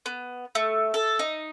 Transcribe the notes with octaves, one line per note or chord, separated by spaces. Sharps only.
B3
A3
A4
D#4